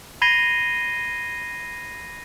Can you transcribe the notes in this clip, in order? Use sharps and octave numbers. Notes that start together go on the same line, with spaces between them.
B5 G#6 A#6 C7 D#7 G7